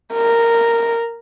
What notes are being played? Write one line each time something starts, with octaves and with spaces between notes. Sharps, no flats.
A#4